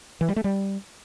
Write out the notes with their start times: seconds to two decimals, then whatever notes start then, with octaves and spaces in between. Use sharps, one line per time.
0.21 E3
0.29 G3
0.36 A3
0.44 G3